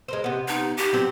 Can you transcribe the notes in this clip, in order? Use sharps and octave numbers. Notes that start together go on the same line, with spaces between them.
G#3 A#4 C5
C3 B3
D#4
G4
F#3 C4 C5